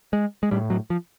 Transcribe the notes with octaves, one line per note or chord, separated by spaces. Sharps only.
G#3
G#3
A2 G3
F#3
F3